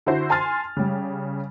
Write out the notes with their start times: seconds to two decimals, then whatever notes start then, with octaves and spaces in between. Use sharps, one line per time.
0.06 D3 E4 F#4 C5
0.30 G#5 A5 C6 F6 A6
0.77 C#3 G3